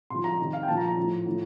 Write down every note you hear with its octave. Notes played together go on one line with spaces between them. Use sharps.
C3 F3 C6
A#5
C3 D#3
F5
G5
A#2 F3 A5
A#5
A#5
A2 F3
A2 F3